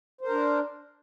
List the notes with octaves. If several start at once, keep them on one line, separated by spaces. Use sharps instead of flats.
D4 A#4 C5